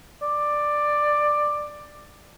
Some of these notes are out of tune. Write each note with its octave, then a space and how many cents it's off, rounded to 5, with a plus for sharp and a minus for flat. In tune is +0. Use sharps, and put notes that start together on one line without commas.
D5 +10